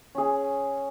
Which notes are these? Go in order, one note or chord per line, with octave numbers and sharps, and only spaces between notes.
C#4 G#4